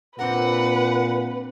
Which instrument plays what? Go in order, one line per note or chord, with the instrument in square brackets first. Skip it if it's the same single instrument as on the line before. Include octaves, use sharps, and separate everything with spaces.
[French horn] A#2 [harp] C4 D4 A#4 [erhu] B4 [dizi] F#5